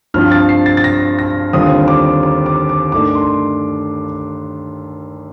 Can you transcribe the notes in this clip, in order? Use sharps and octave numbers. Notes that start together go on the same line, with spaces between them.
G2 F3 C4 F4 F6
A6
C7
A6
A6
A#6
A#6
D#2 D3 G3 C4 F4 D#6
D6
D6
D6
D6
G2 D#3 A3 D4 D6
C6